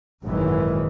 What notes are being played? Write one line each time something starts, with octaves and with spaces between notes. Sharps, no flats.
G#1 F#2 A#2 D#3 E3 G#3